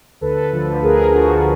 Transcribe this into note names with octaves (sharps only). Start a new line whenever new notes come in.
D2 A4 B4
D3 F3
B4
D2 G#4 A#4
D3 F3 F#4 G#4